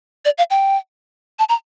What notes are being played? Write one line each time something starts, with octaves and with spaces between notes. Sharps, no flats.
D5
F5
G5
A5
A#5